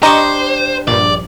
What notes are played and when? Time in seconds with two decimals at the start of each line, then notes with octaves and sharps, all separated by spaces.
0.03 D4 G4 C5 D#5 A#5 C#6
0.88 A#1 G2 D5